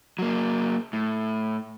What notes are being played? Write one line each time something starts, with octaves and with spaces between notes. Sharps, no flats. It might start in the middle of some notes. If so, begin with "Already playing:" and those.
F#3 A#3
A2